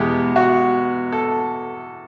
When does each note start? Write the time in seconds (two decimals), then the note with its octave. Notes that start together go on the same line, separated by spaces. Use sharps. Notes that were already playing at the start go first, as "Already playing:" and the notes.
Already playing: E2 B2 G#3 B3 G4
0.36 F#4
1.12 A4